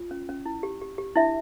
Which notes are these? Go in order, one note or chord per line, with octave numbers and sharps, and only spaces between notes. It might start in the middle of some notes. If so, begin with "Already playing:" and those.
Already playing: F4
C#4
C#4
E4
G4
G4
G4
D4 E4 E5